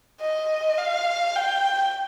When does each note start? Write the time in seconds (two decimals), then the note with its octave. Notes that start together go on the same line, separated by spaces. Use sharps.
0.20 D#5
0.78 F5
1.36 G5